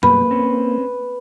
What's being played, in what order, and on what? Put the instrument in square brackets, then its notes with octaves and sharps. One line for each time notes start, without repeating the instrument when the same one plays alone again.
[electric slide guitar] F#2 B2 G3 [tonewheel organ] A#3 [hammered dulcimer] B4 [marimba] B5
[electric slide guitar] C4 C#4